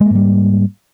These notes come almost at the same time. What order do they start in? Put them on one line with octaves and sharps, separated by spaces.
G#3 A#3 G#2 G3